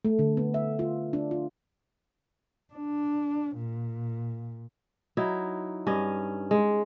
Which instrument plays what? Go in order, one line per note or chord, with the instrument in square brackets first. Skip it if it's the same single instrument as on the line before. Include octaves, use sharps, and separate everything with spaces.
[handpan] A3
D3
B3
E5
F4
D4
F4
[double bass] D4
A#2
[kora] F#3 D#4 E4
G2 C#4 D#5
G#3